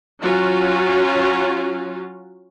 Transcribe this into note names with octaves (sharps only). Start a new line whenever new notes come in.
F#3 C#4 F4 F#4